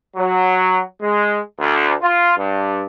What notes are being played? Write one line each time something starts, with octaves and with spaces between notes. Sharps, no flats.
F#3
G#3
D2
F4
G2